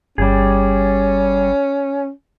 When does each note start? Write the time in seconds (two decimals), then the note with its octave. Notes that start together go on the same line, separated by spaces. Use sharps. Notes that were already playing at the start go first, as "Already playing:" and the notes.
0.18 G1 G3 C#4 G#4